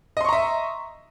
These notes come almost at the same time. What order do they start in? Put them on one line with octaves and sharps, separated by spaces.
D#5 C6 C#6 A#5 E5